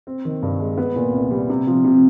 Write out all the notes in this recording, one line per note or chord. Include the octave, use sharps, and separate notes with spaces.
C4
D#3
G2
G#3
B3
A#2
C2
G3
C3
F3
C3